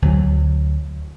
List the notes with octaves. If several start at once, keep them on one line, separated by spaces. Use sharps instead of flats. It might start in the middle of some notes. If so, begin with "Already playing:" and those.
D2 F#3